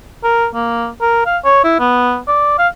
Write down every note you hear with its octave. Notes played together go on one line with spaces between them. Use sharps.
A#4
A#3
A#4
F5
C#5
E4
B3
D5
F5